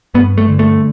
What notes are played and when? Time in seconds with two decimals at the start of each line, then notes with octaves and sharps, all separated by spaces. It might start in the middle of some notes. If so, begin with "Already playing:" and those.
0.14 G2 B3
0.38 A3
0.48 D3
0.59 A3